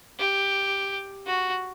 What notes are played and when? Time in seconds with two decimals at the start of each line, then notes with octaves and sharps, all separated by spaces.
0.19 G4
1.26 F#4